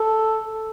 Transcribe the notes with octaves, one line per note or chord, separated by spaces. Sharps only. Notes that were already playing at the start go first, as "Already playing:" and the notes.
Already playing: A4